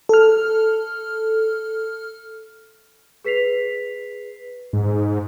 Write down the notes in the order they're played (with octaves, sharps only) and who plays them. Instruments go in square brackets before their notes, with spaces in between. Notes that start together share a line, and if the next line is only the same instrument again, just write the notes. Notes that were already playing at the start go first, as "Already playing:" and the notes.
[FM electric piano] A4 F6
[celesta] G#4 B4 B6 C7 F7
[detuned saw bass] G#2